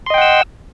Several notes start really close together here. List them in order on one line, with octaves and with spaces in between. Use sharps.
C6 D#5 G5 F#5 E6